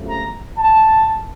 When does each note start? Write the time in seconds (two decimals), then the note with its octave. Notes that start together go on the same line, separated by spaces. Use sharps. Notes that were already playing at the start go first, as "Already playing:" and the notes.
Already playing: G1 F#2 C#3 F3 A3
0.08 A#5
0.58 A5